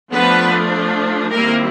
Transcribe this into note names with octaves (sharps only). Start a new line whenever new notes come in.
F3 A3 B3 D4 B4
D#3 G3 A#3 C4 E4 A#4